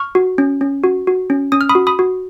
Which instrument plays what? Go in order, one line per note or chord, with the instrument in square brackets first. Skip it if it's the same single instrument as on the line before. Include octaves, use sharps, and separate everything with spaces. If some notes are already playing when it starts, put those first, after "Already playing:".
Already playing: [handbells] C#6 F6
F#4
C#4
C#4
F#4
F#4
C#4
C#4 D#6
F6
B5 D#6
F#4
B5 D#6
F#4